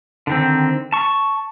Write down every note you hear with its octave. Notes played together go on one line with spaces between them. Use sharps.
D3 D#3 C4
A5 C#6